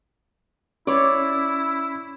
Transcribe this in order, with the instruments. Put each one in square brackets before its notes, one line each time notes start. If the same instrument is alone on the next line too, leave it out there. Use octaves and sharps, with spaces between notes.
[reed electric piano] C#4 [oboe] E4 [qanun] C#5 D5